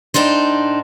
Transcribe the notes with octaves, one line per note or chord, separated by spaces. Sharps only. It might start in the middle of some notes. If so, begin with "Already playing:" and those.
A2 D4 D#4 C5